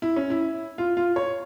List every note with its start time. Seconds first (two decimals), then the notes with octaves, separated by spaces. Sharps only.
0.02 E4
0.16 C#4
0.30 E4
0.78 F4
0.97 F4
1.16 C#5